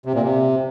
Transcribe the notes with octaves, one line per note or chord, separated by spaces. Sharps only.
C3
A#2
C3